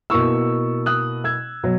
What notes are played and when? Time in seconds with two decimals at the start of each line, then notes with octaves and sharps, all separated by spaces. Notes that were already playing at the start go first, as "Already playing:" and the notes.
0.10 B2 A#3 E4 C#6 E6
0.86 D#6 F#6
1.24 E6 G#6
1.63 B2 F#3